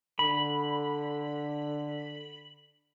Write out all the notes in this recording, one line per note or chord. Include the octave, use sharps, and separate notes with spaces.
D3 B5